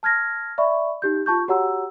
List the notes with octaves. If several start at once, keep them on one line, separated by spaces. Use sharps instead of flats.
A5 F6 G#6 A#6
D5 E5 B5 C#6
D#4 G4 G6
F4 A5 C#6 G6
F#4 G4 C#5 F#5 A#5 E6